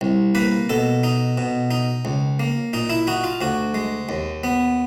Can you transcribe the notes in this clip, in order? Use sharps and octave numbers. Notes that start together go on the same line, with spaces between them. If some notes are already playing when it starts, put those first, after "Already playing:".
C2
A#3 B4
B2 A4
D#4
B2
D#4
C#2
A#3
A#2 D#4
E4
D#4 F#4
F4
D2 F#4
G#3
D#2
B3